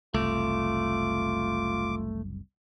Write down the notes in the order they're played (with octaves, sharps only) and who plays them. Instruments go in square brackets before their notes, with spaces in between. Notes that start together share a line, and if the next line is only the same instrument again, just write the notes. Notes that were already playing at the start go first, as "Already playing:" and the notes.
[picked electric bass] F#1 C2 [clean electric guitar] A3 [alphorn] F4 [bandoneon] D6